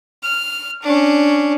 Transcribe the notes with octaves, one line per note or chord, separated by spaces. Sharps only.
F6
C#4 D4